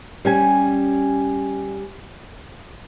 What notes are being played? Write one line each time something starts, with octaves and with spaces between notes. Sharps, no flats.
G3 C#4 G#5